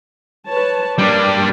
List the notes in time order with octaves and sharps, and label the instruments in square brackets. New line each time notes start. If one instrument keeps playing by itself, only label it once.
[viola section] B4 C#5 A5
[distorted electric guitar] G3 D4 [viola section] A#3 A#4 D5